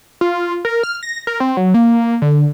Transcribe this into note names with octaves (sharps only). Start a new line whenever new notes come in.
F4
A#4
F6
A#6
A#4
C4
F#3
A#3
D3